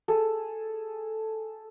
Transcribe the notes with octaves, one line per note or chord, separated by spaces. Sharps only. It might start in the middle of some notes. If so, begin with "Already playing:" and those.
G#4 A4